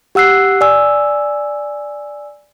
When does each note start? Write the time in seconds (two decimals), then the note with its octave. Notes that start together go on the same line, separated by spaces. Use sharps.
0.15 G4 F#5 E6 F#6 C7
0.61 D5 G#5 E6